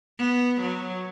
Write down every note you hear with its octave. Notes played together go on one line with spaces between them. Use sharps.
B3
F#3